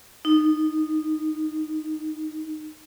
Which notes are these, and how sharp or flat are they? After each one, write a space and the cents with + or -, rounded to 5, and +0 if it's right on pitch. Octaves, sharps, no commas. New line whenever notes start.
D#4 -15